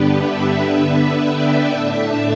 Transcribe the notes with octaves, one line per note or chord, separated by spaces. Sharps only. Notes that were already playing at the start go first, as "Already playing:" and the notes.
Already playing: G2 D3 B3 D4 G4 B4
B4 E5
D3 B3 D4
D5 G5
A2 A3 D4 E5 A5